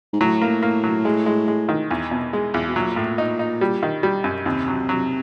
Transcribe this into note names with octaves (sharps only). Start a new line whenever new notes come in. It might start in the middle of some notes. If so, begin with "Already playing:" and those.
G#2
A2 F#3
A#3
A#3
F#3
G#3
G#3
G#3
D#3
E2
B2
G#3
E2
B2
A#2 F#3
A2
D#4
D#4
G3
D#3
G3
F#2
D#2 C3
F#3
F#3